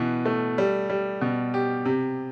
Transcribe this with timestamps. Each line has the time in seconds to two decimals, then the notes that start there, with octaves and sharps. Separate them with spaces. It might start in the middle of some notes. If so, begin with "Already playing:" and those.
Already playing: B2 E3
0.26 A3
0.58 G3
0.90 G3
1.21 B2
1.54 G4
1.85 C3